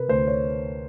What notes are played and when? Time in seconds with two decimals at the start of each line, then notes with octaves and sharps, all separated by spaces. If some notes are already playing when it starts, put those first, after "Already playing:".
Already playing: C3 A#4 B4
0.08 D2 C5
0.27 C#5